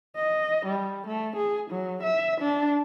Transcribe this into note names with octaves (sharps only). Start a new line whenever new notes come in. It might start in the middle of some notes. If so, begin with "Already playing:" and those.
D#5
G3
A3
G#4
F#3
E5
D4